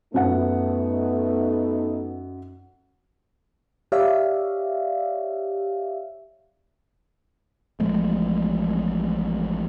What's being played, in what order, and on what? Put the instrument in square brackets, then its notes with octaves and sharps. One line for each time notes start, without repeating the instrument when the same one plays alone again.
[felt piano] F#2 F#5 [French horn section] A3 B3 D#4
[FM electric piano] G4 C#5 D5 E5 F5
[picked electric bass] A1 F3 G#3 A3